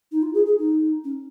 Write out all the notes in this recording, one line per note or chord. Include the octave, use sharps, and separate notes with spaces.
D#4
F4
G#4
G#4
D#4
C#4